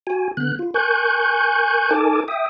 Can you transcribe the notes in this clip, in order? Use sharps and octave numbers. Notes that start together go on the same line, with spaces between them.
F#4 G#5
D3 B3 F#6
F4
A#4 G#5 C#6 F#6 G6
D#4 A4 A#4 G#5 A5 D6
E5 G5 D#6